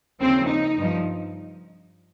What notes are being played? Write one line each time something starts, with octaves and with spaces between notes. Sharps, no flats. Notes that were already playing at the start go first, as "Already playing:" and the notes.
D#2 C#3 F3 C4
D#4
G2 F3